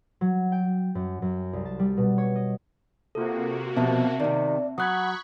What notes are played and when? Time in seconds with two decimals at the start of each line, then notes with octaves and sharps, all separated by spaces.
0.21 F#3
0.52 G5
0.95 F#2
1.22 F#2
1.53 C2
1.65 A5
1.79 G3
1.97 B2
2.18 C#5
2.36 D#5
3.15 C3 A#3 F4 F#4 A4
3.76 B2 F3 C4 E5 A5
4.20 C3 D#3 D5
4.78 F#3 F#5 B5 C#6 D#6 F#6 G#6